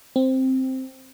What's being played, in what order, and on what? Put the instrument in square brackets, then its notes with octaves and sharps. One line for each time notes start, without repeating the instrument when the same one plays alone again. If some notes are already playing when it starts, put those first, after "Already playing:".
[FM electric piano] C4